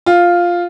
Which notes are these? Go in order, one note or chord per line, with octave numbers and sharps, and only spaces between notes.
F4